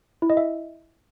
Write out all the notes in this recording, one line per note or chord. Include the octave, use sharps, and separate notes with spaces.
E4
D#5
E5